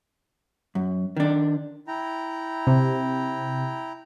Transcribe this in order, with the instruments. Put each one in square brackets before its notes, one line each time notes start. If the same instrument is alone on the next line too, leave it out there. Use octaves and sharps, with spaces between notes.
[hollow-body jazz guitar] F#2
D#3 D4
[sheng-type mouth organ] E4 G5 A#5
[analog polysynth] C3